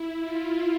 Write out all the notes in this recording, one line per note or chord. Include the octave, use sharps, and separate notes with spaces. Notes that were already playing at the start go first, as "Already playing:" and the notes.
Already playing: E4
F4